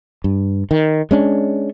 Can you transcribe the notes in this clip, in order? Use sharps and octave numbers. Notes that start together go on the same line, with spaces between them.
G2
D#3
G#3 C#4 D4